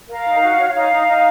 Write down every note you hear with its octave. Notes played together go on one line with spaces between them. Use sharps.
A#4 F5
D#4
F#4
C#5
D#4 F5
D#4
D#4